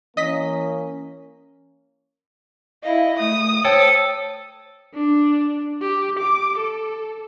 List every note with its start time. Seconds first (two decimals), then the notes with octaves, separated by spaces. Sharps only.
0.17 E3 A#3 C#4 D#5 B6
2.83 E4 D#5 F5
3.19 A3 D#6
3.65 A4 C5 C#5 G5
4.94 D4
5.82 G4
6.19 D6
6.59 A4